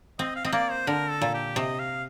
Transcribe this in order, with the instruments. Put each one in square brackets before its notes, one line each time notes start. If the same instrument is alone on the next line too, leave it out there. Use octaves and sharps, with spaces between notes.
[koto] C4 [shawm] D#5
[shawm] F5
[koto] C4 [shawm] D#5
[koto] A#3 [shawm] D5
[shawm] C5
[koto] D3 [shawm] A#4
[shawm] A4
[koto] A#2
[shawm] G4
[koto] C3 [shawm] D#5
[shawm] F5